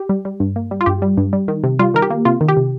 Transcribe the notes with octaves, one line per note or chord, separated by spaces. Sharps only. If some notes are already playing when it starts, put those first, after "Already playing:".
Already playing: G4
G3
G3
G2
A#3
G3
F4
G2 G4
G3
G2
G3
D#3
C3
G3 F4
D#3 A#4
G4
A#3
C3 F4
D#3
G4
C3